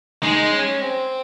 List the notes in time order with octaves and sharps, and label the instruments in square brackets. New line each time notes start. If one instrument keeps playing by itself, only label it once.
[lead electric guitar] G#3 [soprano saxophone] D#4
[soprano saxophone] C#4
C4